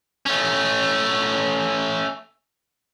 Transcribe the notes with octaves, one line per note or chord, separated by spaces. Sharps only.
A3 C#4